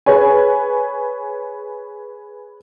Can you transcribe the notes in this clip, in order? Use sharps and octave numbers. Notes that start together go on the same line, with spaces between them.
G#4 B4 C#5 G#5